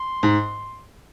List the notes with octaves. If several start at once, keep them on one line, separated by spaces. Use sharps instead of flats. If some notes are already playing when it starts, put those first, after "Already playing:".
Already playing: C6
G#2